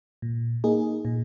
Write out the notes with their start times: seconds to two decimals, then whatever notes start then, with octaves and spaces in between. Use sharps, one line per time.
0.22 A#2
0.64 A#3 D#4 G#4
1.05 A#2